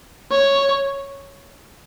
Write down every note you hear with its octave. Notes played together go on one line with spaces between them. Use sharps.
C#5